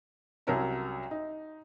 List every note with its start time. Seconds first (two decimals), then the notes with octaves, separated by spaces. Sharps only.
0.47 C2 F#3 C#4 A#4 C#5 A5
1.11 D#4